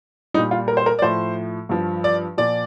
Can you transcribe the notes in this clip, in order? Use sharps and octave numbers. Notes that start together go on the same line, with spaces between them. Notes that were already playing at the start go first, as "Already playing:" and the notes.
A#2 G3 D#4
F4
A#4
C5
A#4
D5
A2 F3 C5
G2 F3
D5
A#2 F3 D5